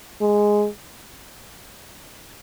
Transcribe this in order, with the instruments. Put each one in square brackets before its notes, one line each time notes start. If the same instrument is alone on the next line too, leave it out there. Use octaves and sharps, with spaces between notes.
[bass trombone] G#3